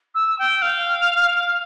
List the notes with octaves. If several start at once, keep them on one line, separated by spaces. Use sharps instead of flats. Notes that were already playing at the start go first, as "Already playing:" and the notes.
E6
G5
F5